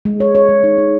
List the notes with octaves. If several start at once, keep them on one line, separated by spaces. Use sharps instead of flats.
G#3
C#5
C#5
G#3
D#4
D#4